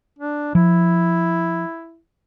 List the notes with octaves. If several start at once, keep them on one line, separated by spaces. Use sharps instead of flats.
D4
F3 E4